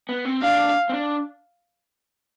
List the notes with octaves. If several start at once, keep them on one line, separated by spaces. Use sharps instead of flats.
B3
C4
D4 F5
C4
D4